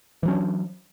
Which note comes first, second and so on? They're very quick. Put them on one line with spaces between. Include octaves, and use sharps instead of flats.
E3 F#3 C#4 D4